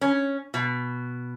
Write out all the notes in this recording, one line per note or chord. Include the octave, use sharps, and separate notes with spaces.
C#4
B2